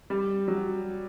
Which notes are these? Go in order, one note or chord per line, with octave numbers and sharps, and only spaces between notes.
G3
F#3